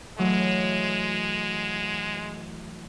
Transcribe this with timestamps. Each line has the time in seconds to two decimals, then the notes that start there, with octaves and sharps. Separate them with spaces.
0.18 E3 F#3 G#3 A3